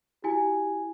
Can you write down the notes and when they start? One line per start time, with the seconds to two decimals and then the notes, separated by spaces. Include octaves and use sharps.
0.24 E4 F#4 G4 G#5